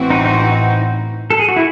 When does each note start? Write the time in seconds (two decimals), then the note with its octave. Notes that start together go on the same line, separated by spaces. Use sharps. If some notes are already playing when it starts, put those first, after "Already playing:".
Already playing: A1 A2 E3 C4 F#4
0.10 D#4
0.26 D#4
0.42 D#4
1.30 A4
1.39 G#4
1.49 F#4
1.56 E4